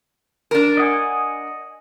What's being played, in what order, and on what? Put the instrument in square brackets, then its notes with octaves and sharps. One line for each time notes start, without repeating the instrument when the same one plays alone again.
[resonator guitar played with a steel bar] D4 A#4
[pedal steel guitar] D#5 F#5 G#5